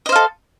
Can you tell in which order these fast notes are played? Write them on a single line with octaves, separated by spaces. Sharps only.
D#5 C5 F5 A4